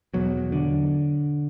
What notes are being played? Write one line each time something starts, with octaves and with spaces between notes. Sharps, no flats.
E2 B2 F#3
D3